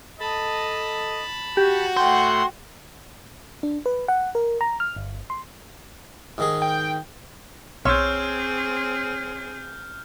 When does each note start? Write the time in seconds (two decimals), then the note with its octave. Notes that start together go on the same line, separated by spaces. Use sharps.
0.20 A4 D#5 A5 B5
1.57 F#4 G4
1.97 A2 A3 F#5 G5 C6
3.63 D4
3.86 B4
4.08 F#5
4.35 A#4
4.61 A#5
4.80 F6
4.96 G1
5.30 C6
6.38 G#2 D#3 G#4
6.62 G5
7.85 B1 C4 G#4 C#5 C6 E6 F6 G6